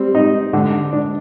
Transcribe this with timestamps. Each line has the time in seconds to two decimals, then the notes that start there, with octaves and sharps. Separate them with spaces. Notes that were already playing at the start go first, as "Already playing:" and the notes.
Already playing: G3 C4
0.15 D#4
0.53 D3
0.93 D4